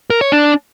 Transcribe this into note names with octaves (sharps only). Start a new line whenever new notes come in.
A#4
C#5
D4